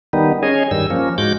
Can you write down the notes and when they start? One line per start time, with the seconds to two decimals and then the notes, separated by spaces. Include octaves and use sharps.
0.13 D#3 G3 B3 D#4
0.43 C#4 G#4 C#5 D#5 G#5
0.71 G2 D#3 G3 E6
0.90 F3 A#3 C#4
1.18 G#2 G#3 F#4 D6 G6